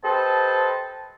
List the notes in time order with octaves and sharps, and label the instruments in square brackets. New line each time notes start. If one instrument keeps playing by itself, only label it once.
[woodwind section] G4 A4 B4 C5 D#5 A5